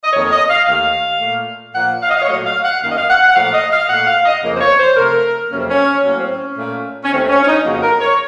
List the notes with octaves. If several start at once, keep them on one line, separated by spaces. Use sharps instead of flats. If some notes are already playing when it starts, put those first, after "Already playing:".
D#5
F2 D#3 A#3 C#5
D#5
F5
D#2 D#3 A3 F5
A#2 A3
A#2 F3 A#3 F#5
F5
D#5
F5
C#5
A#2 F#3 A3 D#5
F5
F#5
F#2 D#3 F#3 A#3 F5
D#5
F5
F#5
F#5
A#2 F3 A3 F5
D#5
F5
A#2 A3 F#5
F5
D#5
F2 C#3 F3 A#3
C5
C#5
C5
C3 F3 A3 A#4
F2 C3 F#3 A#3 C#4
C4
C#4
A2 F#3 A#3 C#4
C4
C#4
A#2 A3
C#4
D#2 D#3 A3 C4
C4
C#4
C#4
D#4
F2 C#3 F3 A#3 F#4
A#4
C#5